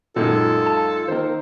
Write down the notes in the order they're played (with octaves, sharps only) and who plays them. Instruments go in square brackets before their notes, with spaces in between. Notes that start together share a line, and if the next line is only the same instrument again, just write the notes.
[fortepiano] F#2 D#3 G#3 [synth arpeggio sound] A#2 [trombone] F4 [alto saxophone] A4
[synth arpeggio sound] A5
[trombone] D#3 [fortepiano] A#3 C5